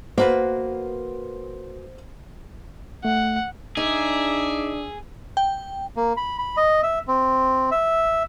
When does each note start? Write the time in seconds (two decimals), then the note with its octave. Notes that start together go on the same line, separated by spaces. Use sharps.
0.18 A#3 F#4 B4 C5
3.05 A3 F#5
3.77 D4 D#4 G#4 E5 D6
5.37 G5
5.96 A#3
6.17 B5
6.39 B5
6.57 D#5
6.83 E5
7.08 C4
7.71 E5